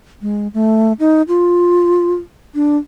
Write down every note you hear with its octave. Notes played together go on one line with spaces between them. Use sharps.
G#3
A3
D#4
F4
D4